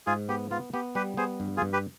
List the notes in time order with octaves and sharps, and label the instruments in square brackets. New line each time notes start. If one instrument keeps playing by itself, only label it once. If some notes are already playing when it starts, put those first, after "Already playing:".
[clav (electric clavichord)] G#2 [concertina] F4 G#4
[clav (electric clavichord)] B3 [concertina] G4
[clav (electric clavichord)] B3 [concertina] F4
[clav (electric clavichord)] B3 [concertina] G4
[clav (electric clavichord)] G3 [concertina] G4 B4
[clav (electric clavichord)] B3 [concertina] G#4 C5
[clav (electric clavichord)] G2
[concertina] F4 G#4
[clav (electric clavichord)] G2
[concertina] G4 B4